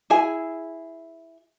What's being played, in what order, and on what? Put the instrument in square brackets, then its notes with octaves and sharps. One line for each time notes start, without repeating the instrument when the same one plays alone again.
[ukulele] E4 G#4 G#5